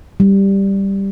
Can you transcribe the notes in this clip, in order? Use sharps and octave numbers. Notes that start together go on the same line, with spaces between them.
G3